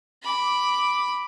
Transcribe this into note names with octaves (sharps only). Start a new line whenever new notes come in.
B5 D6